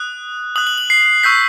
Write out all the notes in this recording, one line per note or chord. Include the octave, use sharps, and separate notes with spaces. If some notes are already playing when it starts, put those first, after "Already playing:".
Already playing: D#6 F#6
D#6 F#6 F#7
F#7
F#7
C7
C#6 E6 G6 B6